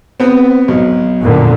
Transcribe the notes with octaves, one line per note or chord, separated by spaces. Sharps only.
B3 C4
B1
F2 A#2 D3